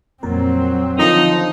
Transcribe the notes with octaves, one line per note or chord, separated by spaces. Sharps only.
F2 A#2 F#3 C4 A#4
D3 D#3 F3 D#4